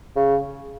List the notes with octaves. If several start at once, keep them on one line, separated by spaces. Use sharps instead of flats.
C#3